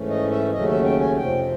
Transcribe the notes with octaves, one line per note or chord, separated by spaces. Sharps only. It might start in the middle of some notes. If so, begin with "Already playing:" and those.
Already playing: G#2 E3 A3 C#4
D#5
E5
D#2 C#3 F#3 A3 C#4 D#5
E5
G5
G#5
F2 C3 F3 G5